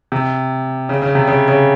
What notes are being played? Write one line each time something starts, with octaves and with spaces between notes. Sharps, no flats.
C3
C#3
C#3
C3
C#3
C#3